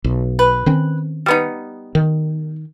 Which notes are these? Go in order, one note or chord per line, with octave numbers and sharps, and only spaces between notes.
B1
B4
D#3 C4 C#4
G3 B3 D#4
D#3